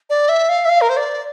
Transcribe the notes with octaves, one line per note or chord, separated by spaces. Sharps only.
D5
E5
F5
E5
F5
A#4
C5
D5